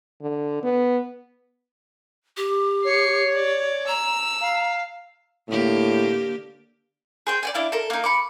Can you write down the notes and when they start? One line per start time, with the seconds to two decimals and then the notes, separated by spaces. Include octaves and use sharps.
0.21 D3
0.63 B3
2.37 G4
2.85 C#5 C7 C#7
3.35 D5
3.88 A#5 E6
4.41 F5
5.49 A2 D3 A#3 G4
7.27 G#4 C5 G5
7.43 D5 G5 G#5
7.54 D4 E4 F5
7.72 A4 A#4
7.90 A#3 D#4
8.04 B5 C#6 D6